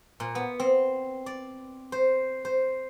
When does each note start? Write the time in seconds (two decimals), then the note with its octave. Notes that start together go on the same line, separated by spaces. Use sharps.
0.20 A#2
0.35 B3
0.60 C4
1.26 D5
1.92 C5
2.45 C5